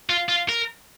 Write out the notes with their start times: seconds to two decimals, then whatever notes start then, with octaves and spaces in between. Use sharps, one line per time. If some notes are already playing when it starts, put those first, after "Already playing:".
0.10 F4
0.29 F4
0.49 A#4